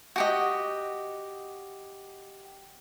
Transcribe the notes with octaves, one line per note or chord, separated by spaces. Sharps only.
F#4 G4 D#5